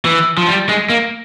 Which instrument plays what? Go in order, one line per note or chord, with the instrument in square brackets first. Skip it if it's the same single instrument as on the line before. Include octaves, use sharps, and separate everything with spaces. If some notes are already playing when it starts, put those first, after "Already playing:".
[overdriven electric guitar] E3
F3
G3
G#3
A#3